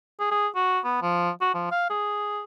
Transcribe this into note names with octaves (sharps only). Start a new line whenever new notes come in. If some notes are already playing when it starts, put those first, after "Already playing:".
G#4
G#4
F#4
B3
F3
F#4
F3
F5
G#4